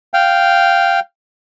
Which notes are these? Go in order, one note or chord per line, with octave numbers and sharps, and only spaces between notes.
F5 G5